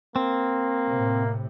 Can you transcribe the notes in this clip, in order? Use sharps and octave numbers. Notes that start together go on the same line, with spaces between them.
A#3 C4
A2 C3